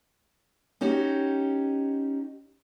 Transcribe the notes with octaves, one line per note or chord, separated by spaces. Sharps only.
C#4 D#4 F#4 G4